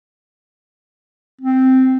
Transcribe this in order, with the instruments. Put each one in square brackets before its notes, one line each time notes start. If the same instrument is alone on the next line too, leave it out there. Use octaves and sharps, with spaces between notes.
[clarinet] C4